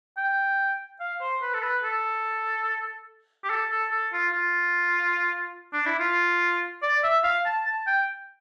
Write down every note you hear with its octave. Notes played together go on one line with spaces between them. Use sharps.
G5
F5
C5
B4
A4
B4
A4
G4
A4
A4
A4
F4
F4
D4
E4
F4
D5
E5
F5
A5
A5
G5